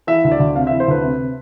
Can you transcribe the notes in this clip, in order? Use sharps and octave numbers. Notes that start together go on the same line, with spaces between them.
E3 E5
D2
D5
D2
C3 F5
E5
E3
C5
D2 B4
C3